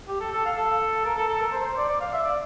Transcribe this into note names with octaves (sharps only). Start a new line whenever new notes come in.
G4
A4
A4
F5
A4
A#4
A4
A4
A#4
C5
C5
D5
D5
F5
E5
D5